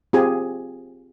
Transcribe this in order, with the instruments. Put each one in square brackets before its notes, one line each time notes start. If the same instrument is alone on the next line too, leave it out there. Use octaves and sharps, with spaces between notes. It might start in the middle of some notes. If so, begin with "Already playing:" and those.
[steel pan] C4 F4 G4 G#4 G#5